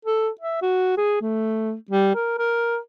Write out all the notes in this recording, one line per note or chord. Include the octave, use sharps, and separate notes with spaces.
A4
E5
F#4
G#4
A3
G3
A#4
A#4